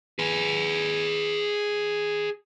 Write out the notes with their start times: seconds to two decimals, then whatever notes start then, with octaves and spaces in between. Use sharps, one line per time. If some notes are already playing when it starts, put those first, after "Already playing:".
0.19 G#4 B4